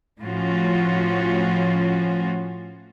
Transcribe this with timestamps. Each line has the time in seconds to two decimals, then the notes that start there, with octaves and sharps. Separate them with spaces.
0.20 A2 F3 C#4 F4 F#4